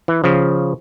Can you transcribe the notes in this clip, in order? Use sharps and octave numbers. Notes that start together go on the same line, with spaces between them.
E3
C#3 F3